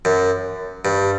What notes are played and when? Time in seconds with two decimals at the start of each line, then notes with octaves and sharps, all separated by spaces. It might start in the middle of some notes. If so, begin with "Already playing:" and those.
0.05 F#2
0.85 G2